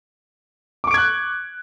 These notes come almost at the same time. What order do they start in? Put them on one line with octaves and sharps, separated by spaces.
D6 C#6 D7 G#6 F#6